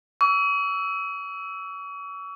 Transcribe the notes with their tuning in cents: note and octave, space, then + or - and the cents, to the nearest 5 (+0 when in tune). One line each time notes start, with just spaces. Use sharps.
C#6 +40 E6 +0